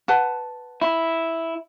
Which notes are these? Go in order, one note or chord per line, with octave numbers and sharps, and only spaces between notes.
B4 F#5 A5
E4